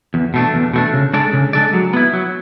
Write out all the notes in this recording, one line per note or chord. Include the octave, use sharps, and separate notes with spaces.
E2
B2 A3 D4
E2
B2 A3 D4
C#3
G#3 D4 A4 D5
C#3
G#3 D4 A4 D5
F#3
B3 E4
F#3